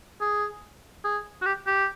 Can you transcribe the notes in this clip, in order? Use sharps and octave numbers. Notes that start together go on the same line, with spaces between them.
G#4
G#4
F#4
G4
G4